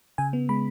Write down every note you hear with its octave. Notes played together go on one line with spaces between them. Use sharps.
C#3 G#5
B3
G#3 B5